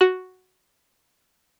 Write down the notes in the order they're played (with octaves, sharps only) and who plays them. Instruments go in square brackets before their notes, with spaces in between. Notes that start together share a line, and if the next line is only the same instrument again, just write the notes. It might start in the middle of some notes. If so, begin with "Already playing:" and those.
[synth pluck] F#4